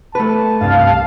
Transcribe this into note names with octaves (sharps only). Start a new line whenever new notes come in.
A3 B4 A5
C2 G2 F5